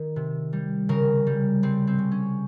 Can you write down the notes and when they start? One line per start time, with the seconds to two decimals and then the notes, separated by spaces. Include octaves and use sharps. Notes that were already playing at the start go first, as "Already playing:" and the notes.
Already playing: D#3
0.16 C3
0.53 G3
0.89 C#3 A#4
1.26 G3
1.63 G3 C4
1.87 C4
1.98 C#3
2.11 C#4